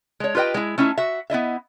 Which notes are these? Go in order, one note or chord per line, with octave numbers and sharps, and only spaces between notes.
G#3 C#5
F4 G4 B4 D#5 G5
G#3 E4
A3 C#4 D#4 E4
F#4 E5
B3 E4 D#5 E5